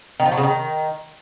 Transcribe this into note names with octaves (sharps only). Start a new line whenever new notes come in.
D#3
F3
F#3
C#3
D#3